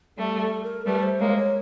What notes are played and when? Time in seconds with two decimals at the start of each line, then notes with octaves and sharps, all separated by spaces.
0.18 G3 A3 A4
0.41 A4
0.63 A#4
0.86 G3 A3 B4
1.03 C5
1.20 G#3 A#3 C#5
1.37 C#5